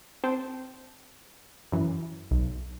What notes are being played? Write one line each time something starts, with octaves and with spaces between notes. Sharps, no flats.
C4 C5 G5 A5
F#2 E3
B1